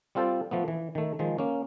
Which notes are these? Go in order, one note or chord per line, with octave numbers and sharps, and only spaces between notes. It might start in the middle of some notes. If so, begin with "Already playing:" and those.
G3 C4 F4 A4 C5
F3 A3 B3
E3
D#3 A3
D#3 F3 G#3
A#3 C#4